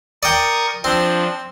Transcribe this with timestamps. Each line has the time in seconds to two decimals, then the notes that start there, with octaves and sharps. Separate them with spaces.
0.23 A#4 D5 G5 C#6 D#6
0.84 F3 C4 D4